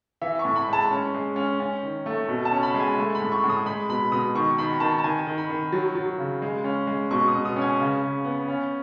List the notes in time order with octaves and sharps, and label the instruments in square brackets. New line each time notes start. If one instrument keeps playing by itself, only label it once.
[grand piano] E3 E5
C#6
A2
B5
G#3 A5
C#4
G#3
C#4
C#4
D#3
A3
B2
A5
C#4
B5
G#3
G#5
A3
B5
A2
C#6
A2
D#6
G#3 B5
B2 B5
B2 D#6
D#3 C#6
D#3 B5
D#3 A5
A5
D#3 G#5
D#3
B5
D#3
F#3
F#3
C#3
G#3
C#4
G#3
B2 C#6
D#6
B2
D#6
C#4
G#5
C#3
C#3
B3
C#4